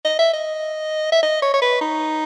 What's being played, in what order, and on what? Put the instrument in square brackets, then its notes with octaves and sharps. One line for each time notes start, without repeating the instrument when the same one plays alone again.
[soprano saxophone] D#5
E5
D#5
E5
D#5
C#5
C#5
B4
D#4